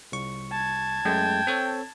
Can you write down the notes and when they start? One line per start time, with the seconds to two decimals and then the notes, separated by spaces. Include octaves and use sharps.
0.12 C2 C#6
0.51 A5 G#6
1.05 F#2 G#3 A3 G5
1.47 C4 A4 C#5